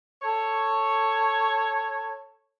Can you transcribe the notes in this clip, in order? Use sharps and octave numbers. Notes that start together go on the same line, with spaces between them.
A4 C#5